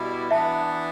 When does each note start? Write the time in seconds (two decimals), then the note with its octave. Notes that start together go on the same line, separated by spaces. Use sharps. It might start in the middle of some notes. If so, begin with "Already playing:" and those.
Already playing: B2 G3 E4
0.31 E3 B3 D4 E5 A5